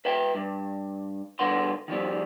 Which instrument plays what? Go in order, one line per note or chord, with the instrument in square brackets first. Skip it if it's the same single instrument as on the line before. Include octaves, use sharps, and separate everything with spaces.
[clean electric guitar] B4 E5 G5
G2
G2 D3 A#4 B4 F#5 C6
D#3 F3 G3 C4